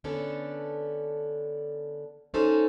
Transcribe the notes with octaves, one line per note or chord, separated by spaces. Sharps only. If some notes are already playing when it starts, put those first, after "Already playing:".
D3 B3 C#4 D4 A4
C#4 D#4 G#4 A4 C5